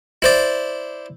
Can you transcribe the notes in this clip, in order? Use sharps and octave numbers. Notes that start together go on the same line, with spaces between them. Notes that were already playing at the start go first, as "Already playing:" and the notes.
E4 C5 D5